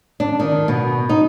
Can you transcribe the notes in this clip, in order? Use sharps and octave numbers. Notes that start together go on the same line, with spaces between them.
D4
D#3
B2
D#4